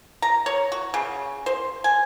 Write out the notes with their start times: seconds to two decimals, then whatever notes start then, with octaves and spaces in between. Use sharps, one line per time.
0.22 A#5
0.46 C#5
0.72 F#4
0.94 C#3
1.46 C5
1.84 G#5